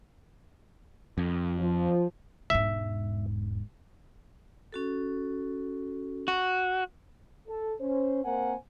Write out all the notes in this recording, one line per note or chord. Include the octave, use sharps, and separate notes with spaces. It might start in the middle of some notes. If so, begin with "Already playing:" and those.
F2
F3
E1 G#2 E5
C#4 F#4 A4
F#4
A4
C#4 C5
A#3 C4 A#4 C5 F#5 G#5